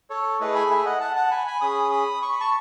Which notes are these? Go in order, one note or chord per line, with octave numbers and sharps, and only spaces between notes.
A4 C#5
A3 E4 G#4 B4 D#5
G#5 B5
E5 G#5
D#5 F#5
F#5 A5
F#5 A5
G#5 B5
G#5 B5
C#4 G#4 B5 D#6
B5 D#6
C#6
B5
A5 C#6